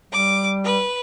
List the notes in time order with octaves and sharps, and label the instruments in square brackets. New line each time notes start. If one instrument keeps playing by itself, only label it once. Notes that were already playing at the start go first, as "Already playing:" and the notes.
[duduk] G3 [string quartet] D6
[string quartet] B4